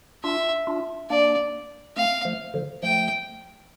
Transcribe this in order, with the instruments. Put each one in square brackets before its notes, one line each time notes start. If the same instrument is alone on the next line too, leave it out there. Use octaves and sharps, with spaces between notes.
[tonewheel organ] D4 F4 [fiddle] E5
[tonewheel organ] D4 F4
[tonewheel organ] A#3 D4 [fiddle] D5
[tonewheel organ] A3 C4 [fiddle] F5
[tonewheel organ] F3 A3
D3 F3
[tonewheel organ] F3 A3 [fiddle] G5